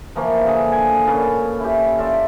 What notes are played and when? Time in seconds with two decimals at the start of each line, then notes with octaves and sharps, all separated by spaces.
0.15 E3 F3 A#3 C#6
0.46 D3 G#4
0.72 G#5
1.07 A#2 C#4 B4 A5
1.60 E4 G4
1.98 F4 A4 D5 E5